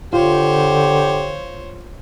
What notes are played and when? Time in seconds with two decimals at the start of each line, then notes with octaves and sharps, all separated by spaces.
0.13 D3 F4 G4 C5 C#5